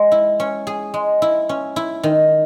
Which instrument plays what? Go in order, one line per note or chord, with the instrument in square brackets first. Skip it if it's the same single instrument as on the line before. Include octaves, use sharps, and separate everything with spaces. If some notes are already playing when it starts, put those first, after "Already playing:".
Already playing: [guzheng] G#3
E4
C#4
G#4
G#3
E4
C#4
E4
D#3